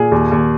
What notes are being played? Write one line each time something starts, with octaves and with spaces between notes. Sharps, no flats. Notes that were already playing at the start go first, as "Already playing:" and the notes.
Already playing: A#2 G#4
D#2
D#2